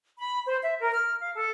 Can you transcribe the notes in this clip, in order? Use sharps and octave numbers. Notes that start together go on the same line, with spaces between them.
B5
C5
E5
A#4
F6
F5
A4